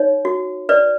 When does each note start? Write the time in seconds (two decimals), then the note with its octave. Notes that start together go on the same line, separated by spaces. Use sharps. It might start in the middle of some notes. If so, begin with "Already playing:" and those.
Already playing: D#4 C#5
0.25 F#4
0.69 B4 D5